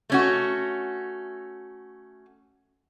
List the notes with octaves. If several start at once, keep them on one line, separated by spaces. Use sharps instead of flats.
A3 C#4 F#4